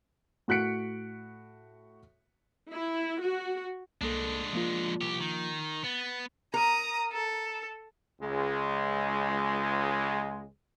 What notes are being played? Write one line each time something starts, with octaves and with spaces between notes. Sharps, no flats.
A2 F#4 F#6 B6 C#7 D7
E4
F#4
C2 G#3 A#3 D4 A4
F3 A#3 F4
C2 G4
D#3
B3 A6
A#4 A#5 D#6
A4
C#2 G#3